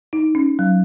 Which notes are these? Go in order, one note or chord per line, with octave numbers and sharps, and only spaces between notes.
D#4
C#4
F#3